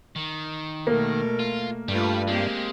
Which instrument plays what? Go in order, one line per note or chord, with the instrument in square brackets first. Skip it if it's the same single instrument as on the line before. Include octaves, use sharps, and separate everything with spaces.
[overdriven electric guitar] D#3
[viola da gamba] B2 A3 A#4 [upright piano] A#3
[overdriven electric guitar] F4
[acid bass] G2 [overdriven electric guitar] G3 [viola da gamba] A3 F4 B4
[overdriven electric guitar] G#3 [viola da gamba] A#3 C4 G4